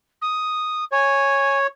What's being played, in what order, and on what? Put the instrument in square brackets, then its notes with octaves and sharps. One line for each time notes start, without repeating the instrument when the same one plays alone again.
[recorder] D#6
[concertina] C#5 [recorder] G#5